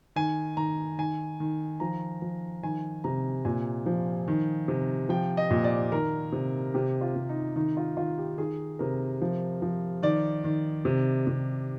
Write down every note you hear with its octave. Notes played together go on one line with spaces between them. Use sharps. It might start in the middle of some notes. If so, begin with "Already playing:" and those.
D#3 G#5
D#3 A#5
D#3 G#5
D#3
F3 A#5
F3
D#3 G#5
C3 A#5
A#2 G#5
F3
D#3
C3
F3 G5
D#5
A#2
D5
D#3 A#4
C3
C3 G4
F4
C3
D#4
D#3 D#4
F4
D#3 F4
G4
D#3 G#4
C3 A#4
F3
F3
D#3 D5
D#3
C3
C3